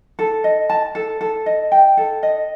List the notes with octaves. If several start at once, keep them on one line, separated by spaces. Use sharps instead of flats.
A4
D#5
A5
A4
A4
D#5
G5
A4
D#5